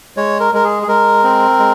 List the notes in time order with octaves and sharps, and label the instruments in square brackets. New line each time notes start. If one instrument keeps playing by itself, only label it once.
[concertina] G#3 C#5
A#4
G#3 A#4
G#4
G#4
G#3 A#4
C4
G#3